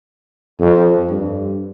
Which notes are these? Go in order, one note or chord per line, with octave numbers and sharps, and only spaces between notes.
F2
G2